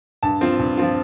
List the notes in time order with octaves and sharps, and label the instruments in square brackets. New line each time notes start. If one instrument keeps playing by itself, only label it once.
[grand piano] G2 A5
F3 C4 F4
G2
F3 C4 F4